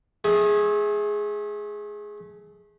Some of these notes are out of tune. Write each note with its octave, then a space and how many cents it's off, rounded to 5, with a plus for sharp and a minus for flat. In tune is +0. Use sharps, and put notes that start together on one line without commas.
A3 -25 G#4 +0